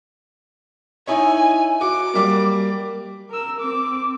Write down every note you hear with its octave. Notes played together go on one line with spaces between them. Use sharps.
D#4 E4 C#5 G#5
F#4 D6
G3 A#3
A#4 E6
C4 D6